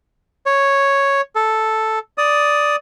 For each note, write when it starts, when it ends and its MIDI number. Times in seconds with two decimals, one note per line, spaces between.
0.46 1.21 73
1.35 1.99 69
2.18 2.76 74
2.18 2.76 87